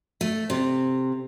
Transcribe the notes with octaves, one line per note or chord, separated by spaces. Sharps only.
A3
C3